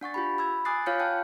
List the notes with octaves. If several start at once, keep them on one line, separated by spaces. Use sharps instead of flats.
D4 F#5 C#6 A6
F4 G4 B5
B5 E6 G#6
G#5 D6 D#6 F#6 A6 C7
F4 C#5 F5 F6 G6 C#7
G5 A5 F#6